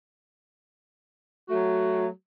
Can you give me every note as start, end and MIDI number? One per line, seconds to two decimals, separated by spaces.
1.49 2.08 54
1.49 2.08 57
1.49 2.08 66